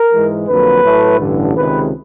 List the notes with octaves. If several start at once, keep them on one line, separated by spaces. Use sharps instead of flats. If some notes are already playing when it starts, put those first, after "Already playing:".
Already playing: A#4
G#2 E3 G#3
F2 D3 F#3 A#3 B4
A2 F#3 A3
A1 G2 D3
C#2 C3 D#3 G#3 B4